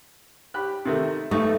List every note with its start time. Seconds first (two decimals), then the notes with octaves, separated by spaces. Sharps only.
0.54 G4 B5 F#6
0.85 C3 D#3 A3
1.31 B1 A3 D#4 C#6